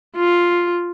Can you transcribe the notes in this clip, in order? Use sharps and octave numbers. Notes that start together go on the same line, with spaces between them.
F4